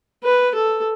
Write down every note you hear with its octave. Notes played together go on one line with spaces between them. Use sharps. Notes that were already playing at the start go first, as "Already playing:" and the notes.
B4
A4